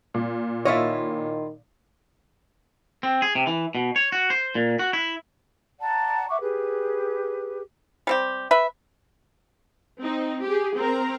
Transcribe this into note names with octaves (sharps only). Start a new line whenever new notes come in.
A#2
D#3 E4 F4 C#5 D#5 E5
C4
G#4
C3
E3
B2
C#5
F#4
C5
A#2
F#4
E4
D5 F#5 A5 A#5
E5 F#5 C#6 D6
G4 G#4 B4
G3 C4 G4
B4 E5
C4 D#4
G4 G#4
C4 A#4 A#5